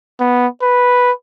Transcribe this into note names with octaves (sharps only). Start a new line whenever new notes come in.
B3
B4